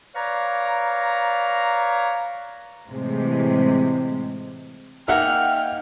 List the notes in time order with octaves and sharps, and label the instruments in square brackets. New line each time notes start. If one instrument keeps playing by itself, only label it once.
[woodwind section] B4 C#5 D5 F5 A#5
[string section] A2 C3 E3 G#3
[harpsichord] A#3 D#4 G#4 [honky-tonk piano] E5 F#5 [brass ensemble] G5 [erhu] F6